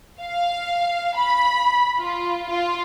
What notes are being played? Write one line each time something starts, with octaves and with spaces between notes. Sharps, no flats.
F5
B5
F4
F4